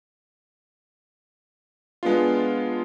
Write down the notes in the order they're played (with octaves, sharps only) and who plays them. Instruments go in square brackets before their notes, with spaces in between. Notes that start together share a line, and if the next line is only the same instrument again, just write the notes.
[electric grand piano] G#3 B3 D4 F4